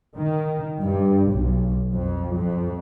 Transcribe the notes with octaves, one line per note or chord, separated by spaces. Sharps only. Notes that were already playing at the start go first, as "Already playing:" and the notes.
D#3
G2
B1
F2
F2